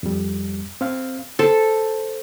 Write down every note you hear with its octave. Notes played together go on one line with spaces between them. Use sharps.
F2 G3
C4 F5
A4 C5